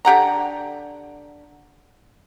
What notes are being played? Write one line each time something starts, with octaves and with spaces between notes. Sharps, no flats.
D3 G4 F#5 A#5